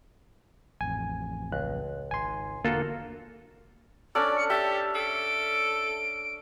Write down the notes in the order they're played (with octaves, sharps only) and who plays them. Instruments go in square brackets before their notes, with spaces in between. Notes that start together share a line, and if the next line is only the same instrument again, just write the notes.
[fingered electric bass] A1 F2 [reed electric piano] G#5
[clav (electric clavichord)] C#2 [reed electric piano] F#6
[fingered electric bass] G#1 [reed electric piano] G#5 C6
[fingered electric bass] E1 D3 [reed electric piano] A#3 [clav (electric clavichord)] F4 F#4 A4
[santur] C#4 D4 A4 [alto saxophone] D5
[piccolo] C#7
[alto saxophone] G4 [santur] E5 [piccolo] A5
[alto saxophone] A4 [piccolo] D7